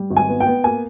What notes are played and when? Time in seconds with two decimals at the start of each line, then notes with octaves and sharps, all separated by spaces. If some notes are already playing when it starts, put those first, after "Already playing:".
Already playing: G3
0.10 G#1
0.17 G#5
0.28 B3
0.40 G5
0.47 B3
0.64 A#3 G#5